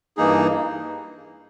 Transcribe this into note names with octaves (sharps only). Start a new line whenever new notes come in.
G2 E3 A#3 D#4 G#4